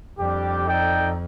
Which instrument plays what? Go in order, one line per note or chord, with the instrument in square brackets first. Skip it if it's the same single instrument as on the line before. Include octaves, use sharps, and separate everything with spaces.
[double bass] F2 [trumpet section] G3 D4 G4
[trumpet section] D#4 A4 D5 G5